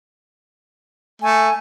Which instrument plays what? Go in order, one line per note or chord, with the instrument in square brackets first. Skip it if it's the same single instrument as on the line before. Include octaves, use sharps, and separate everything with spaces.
[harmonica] A3 [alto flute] G#5